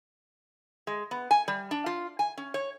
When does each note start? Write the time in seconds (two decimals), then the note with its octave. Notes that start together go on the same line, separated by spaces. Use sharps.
0.87 G#3
1.11 B3
1.31 G#5
1.48 G3
1.71 D4
1.86 F4
2.19 G#5
2.37 C#4
2.54 C#5